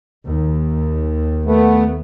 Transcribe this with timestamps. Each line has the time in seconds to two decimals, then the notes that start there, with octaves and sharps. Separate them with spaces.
0.24 D#2
1.45 A3 B3